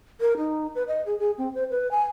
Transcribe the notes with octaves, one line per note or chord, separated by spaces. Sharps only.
A#4
D#4
B4
D#5
G#4
G#4
C4
C5
B4
G#5